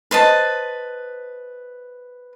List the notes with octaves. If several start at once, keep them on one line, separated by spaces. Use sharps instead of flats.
B4 C5 D#5 A5